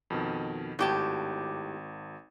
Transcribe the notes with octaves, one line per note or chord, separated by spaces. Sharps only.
F2 B2 D#3
G#1 A2 F#4 G4 A5 G#6